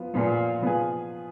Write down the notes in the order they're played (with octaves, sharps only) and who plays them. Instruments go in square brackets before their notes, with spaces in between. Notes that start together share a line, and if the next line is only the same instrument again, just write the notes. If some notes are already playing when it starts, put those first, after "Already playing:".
Already playing: [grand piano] F3 B3 F4
[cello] A#2 [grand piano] F3 B3 F4 G#4
[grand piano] F3 B3 F4 G#4